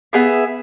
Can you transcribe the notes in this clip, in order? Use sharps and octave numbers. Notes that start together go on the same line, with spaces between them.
B3 G#4 E5